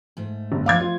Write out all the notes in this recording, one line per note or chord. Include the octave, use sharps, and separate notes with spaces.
G#2 A3
G1
F3 A3 F5 D6 G#6
F4